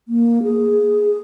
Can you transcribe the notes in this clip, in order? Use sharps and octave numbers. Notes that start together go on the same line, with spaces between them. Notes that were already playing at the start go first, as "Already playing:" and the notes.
A#3
G#4